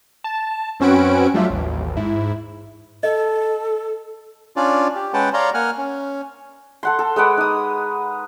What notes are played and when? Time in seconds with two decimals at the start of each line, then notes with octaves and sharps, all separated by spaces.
0.24 A5
0.80 F#2 C4 C#4 F#4 B4 D7
1.34 F#3 G3 A3 D4 F4 E5
1.50 A1 D#2
1.97 G#2 E4
3.03 A4 D#5
4.56 C#4 D4 F4 D5
4.95 G4
5.13 G#3 C#4 B4 F#5 G5 A5
5.34 C#5 D5 F5 A#5 C6
5.54 A#3 F#5 G#5 F6
5.78 C#4
6.83 A4 F#5 C6
6.99 A4
7.16 G#3 B4 F#5 D6
7.37 D#4 D#6